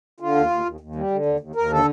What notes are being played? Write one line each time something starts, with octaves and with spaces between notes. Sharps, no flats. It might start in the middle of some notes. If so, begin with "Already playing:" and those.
D3 F4
D#2
D#2
D#2
D#2
G3
D3
D#2
D#2
D#2 A#4
D3 A4